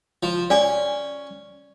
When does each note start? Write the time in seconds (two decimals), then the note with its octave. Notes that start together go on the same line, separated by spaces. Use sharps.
0.23 F3
0.50 C#4 D5 G#5